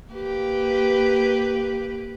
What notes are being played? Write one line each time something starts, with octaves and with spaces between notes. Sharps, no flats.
A#3 G4 B4